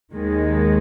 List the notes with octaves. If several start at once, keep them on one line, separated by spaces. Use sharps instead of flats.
D#2 D#3 G#3